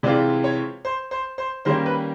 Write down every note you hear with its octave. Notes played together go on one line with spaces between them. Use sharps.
C3 E3 G#3 C4 F4 D5
C#5
C5
C5
C5
D#3 G3 A#3 C#4 C5
B4